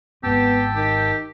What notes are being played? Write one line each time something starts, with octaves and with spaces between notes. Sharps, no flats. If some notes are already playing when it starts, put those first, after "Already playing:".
G#1 G#2 B3 C4 G4 G5 A5 E6
D#3 G4